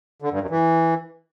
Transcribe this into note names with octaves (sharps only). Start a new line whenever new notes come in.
D3
G2
F#2
E3